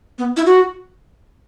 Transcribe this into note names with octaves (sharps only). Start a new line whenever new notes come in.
B3
E4
F#4